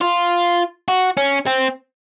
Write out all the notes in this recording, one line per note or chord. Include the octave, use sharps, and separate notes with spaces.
F4
F#4
C#4
C4